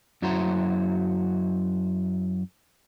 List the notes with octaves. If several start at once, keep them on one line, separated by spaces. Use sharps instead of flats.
F#2 F#3 E4 F#4 C5 A#5